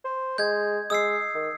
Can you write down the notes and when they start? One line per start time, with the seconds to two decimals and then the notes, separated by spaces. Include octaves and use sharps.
0.05 C5
0.38 G#3 G6 G#6
0.90 G#3 D#6 E6 C7
1.35 D#3